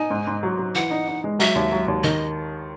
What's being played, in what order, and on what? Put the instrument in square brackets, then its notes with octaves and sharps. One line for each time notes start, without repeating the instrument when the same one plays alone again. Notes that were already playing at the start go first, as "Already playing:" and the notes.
Already playing: [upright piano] D#4 [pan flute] G#5
[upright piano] G#2
G#2
F#3
F#3
[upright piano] E3 [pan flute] F#5
[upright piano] D#4
D#4
G#3
[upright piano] F#3 [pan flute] E5
[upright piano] D#2
F#3
D#2
[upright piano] D#3 [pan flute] D#5